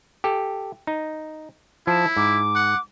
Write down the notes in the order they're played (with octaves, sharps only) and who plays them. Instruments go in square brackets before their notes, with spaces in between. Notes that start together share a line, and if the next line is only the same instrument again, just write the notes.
[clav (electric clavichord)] G4 A4
D#4
[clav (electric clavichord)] F3 [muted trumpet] E4 [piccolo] A5
[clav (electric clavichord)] G#2 [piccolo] D6
[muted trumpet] F#5